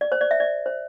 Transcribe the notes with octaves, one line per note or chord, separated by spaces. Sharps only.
D5
C5
D5
E5
D5
C5